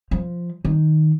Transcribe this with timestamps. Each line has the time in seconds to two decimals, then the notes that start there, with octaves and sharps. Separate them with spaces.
0.11 F3
0.65 D#3